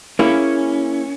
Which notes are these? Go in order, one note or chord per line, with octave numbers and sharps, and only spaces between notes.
A#3 C#4 E4 G#4